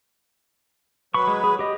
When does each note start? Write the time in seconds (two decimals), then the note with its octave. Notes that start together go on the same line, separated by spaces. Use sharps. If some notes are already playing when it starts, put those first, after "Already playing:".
1.14 F#3 B4 B5 C#6
1.27 G#3
1.44 G#4
1.59 G4 D#5